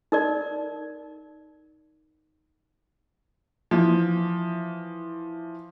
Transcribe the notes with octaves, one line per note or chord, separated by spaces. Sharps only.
D#4 A#4 D5
E3 F3